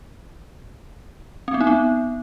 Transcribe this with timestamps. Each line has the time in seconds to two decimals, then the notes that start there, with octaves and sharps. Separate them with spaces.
1.48 C4
1.54 B3
1.61 D#4
1.67 B3